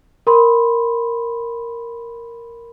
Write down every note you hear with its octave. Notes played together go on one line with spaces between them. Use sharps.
A#4 B5 C6